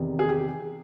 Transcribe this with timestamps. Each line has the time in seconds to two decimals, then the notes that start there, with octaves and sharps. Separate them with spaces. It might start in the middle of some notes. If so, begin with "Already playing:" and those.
Already playing: E2 C3 D#3
0.19 G#4
0.29 G4